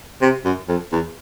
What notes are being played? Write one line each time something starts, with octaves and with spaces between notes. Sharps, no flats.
C3
F#2
F2
E2